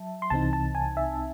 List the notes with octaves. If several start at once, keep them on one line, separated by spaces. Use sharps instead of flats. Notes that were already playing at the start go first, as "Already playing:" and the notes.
Already playing: F#3 E5 A5
C6
C2 C3 E3 C4 D#4 A5
A5
G#5
E5